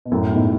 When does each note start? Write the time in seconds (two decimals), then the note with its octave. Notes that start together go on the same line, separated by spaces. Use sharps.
0.05 B2
0.11 F#2 A2
0.33 G#2 B2